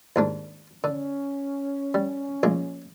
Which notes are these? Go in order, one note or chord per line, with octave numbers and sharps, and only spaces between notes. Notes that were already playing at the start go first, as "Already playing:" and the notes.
D#2 G#2 D4
D3 C#4
G3
A#1 G#3